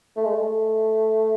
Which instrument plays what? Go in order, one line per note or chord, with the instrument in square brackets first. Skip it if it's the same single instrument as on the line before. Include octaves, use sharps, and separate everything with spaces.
[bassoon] A3
G#3
A3